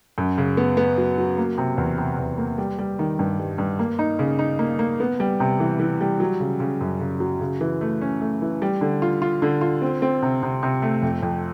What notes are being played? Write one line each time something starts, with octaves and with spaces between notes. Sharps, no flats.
F#2
C#3
B3
B3
F#3
F#3
A#3
C3
E2
C3
E2
A#3
G3
G3
D#3
G2
G3
G2
A#3
D#4
C#3
D#4
A#3
A#3
B3
G3
C3
E3
E3
G3
F#3
C#3
C#3
F#2
C#3
F#3
C#3
E3
A3
C#4
A3
E3
G3
D3
F4
F4
D3
F4
C4
C4
C3
C3
C3
A3
F2
F2